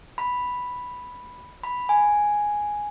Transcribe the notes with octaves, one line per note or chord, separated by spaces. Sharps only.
B5
B5
G#5